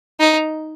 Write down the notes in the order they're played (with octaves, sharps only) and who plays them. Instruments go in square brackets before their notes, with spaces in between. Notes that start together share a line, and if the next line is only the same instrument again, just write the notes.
[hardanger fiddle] D#4